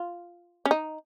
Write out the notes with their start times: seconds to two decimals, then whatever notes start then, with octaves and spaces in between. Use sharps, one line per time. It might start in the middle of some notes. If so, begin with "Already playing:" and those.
Already playing: F4
0.65 C#4
0.71 D#4